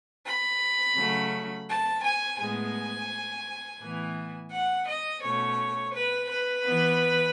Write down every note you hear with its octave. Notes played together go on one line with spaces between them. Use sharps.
B5
C#3 F#3 A3 C#4
A5
G#5
A2 G#3 B3 G#5
A2 E3 B3
F#5
D#5
B2 A3 C#4 C#5
B4
B4
E3 B3